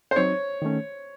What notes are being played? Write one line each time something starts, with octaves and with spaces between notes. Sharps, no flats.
C5
F#3 C4 D#4 C#5
D#3 A3 C#4